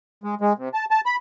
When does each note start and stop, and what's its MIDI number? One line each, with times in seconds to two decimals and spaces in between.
0.24 0.35 56
0.41 0.53 56
0.58 0.69 48
0.74 0.85 81
0.91 1.01 81
1.06 1.16 83